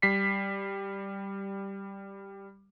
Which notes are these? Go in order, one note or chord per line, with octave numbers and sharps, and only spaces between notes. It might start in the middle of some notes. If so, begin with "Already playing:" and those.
G3 B6 C7